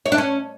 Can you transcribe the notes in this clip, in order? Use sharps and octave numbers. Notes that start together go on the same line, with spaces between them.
C#5
D4
C#4